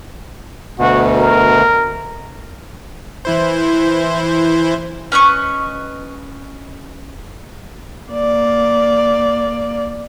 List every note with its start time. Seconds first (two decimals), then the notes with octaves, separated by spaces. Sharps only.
0.79 D2 B2 F#4
1.18 A#4
3.25 E3 E4 C5
5.12 C#4 B4 D#5 C#6
8.11 A#3 D5